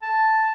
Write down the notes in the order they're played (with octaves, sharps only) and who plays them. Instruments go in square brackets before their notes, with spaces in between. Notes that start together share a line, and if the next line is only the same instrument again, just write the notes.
[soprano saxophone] A5